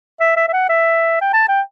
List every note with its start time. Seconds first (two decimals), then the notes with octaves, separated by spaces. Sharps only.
0.20 E5
0.37 E5
0.48 E5
0.53 F#5
0.69 E5
1.21 G5
1.33 A5
1.48 G5